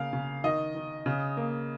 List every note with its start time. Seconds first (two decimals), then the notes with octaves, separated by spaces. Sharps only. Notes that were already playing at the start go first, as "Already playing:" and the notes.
Already playing: C#3 A#3 F5
0.13 C#3
0.44 D#3 D#5
0.75 D#3
1.06 C#3
1.37 A#3